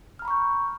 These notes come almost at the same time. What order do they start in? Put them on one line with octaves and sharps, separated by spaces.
F6 A#5 B5 C#6 G6